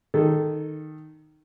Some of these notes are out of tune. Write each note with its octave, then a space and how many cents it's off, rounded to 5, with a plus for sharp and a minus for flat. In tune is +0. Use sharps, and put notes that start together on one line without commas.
D#3 -5 A4 +0